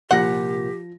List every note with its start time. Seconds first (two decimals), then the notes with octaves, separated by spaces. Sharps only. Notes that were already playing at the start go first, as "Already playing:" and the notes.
0.11 C2 A#2 F3 G4 F#5 C6 A#6